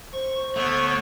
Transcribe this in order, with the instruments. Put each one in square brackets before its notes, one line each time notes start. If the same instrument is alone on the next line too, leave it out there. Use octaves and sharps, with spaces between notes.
[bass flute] C5 [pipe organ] C#6
[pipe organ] D2 D3 B3 [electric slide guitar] A3 [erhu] C#5